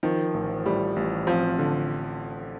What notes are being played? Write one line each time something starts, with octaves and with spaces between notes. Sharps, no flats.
D#3 F3
A1
A2 G3
A1
F3 C4
D3